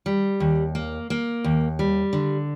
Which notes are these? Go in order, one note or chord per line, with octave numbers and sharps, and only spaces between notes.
G3
D#2
A#3
A#3
D#2
G3
D3